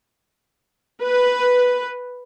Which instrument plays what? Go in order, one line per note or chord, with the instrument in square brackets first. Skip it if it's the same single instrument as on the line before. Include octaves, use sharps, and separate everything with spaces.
[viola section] B4